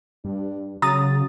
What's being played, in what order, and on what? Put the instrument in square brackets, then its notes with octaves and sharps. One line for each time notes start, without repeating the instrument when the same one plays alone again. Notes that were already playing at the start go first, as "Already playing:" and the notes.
[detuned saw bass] G2 [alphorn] D4
[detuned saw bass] C#3 [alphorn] F#3 [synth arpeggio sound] A#5 D#6 A6